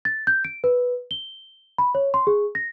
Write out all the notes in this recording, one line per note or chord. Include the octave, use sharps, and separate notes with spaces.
A6
G6
D7
B4
G7
B5
C#5
C6
G#4
A#6